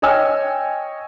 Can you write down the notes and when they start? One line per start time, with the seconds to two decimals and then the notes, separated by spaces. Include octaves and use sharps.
0.02 C#5 D#5 G5 G#5 E6 F6